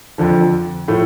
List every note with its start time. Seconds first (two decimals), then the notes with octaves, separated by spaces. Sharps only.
0.18 F2 D3 F3
0.88 A2 F3 A3